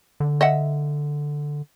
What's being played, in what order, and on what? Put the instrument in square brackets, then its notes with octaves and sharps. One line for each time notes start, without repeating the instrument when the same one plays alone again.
[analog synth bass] D3
[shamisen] D#5 E5 F#5